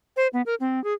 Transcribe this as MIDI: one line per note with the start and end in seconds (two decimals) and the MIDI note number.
0.17 0.28 72
0.33 0.42 59
0.46 0.55 70
0.60 0.82 60
0.84 0.94 68